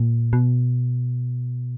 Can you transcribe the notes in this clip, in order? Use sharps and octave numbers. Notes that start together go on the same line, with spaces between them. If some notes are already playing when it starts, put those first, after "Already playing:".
Already playing: A#2
B2